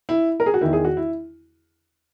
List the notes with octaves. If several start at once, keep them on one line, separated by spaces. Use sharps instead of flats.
E4
A#4
G#4
F#4
E2 D#3 E4
G#4
F#4
E4